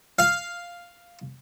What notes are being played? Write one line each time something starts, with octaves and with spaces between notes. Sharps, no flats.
F5